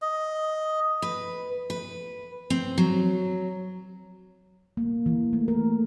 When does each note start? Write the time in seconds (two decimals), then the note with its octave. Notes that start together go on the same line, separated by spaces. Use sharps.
0.02 D#5
1.02 B4
1.70 B4
2.50 C4
2.78 F#3
4.77 A#3
5.06 E3
5.33 A3
5.48 A#4